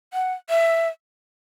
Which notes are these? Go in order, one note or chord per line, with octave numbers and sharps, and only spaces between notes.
F#5
E5